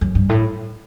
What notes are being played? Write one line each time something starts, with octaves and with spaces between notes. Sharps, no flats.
F#2
G2
A2